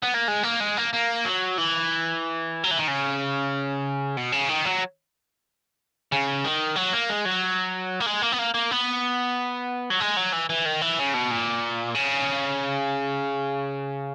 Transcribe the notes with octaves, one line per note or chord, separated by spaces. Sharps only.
B3
A#3
G#3
A#3
G#3
A#3
A#3
F#3
E3
F#3
E3
D#3
C#3
B2
C#3
D#3
F#3
C#3
D#3
F#3
A#3
G#3
F#3
A#3
G#3
A#3
B3
A#3
A#3
B3
F#3
G#3
F#3
E3
E3
D#3
E3
C#3
B2
A#2
C#3